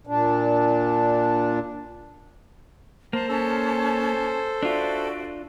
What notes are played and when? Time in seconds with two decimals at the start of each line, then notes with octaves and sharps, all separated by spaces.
0.07 A#2 D4
3.13 A#3 C5 A5
3.29 C#4 A4 C#5 A5
4.63 D4 F4 F#4 D5 E5